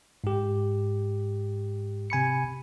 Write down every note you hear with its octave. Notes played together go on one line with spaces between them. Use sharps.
G#2 G4
C3 G#5 B5 C#7